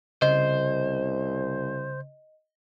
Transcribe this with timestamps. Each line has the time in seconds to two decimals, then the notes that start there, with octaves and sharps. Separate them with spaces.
0.22 C2 C#3 C5 D#5